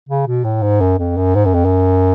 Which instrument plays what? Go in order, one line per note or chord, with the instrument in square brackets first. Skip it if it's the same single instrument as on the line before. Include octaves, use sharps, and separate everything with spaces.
[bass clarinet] C#3
B2
A2
G#2
F#2
F2
F#2
G#2
F#2
F2
F#2